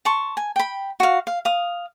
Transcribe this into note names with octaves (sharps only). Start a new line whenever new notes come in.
A5 C6 C#6
G#5
G5 B5
F#4 F5
F5
F5 D#6